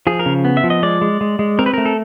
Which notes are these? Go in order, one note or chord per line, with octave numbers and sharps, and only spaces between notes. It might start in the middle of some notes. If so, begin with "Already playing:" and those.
F3 G#4
A#4
C#3
B3
E5
F3
D#5
G#3 D5
G#3
G#3
G#3
C4 A#4
B4
A3 A#4
A4